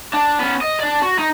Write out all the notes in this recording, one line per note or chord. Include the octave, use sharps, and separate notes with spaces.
D4
B3 C#4
D#5
D5 A5
F#4
D#4